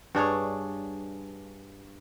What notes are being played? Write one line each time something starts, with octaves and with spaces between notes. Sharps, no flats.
G2 D4 G#4 C#5